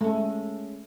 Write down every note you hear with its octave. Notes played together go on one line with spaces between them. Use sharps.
G#3 A3 C#4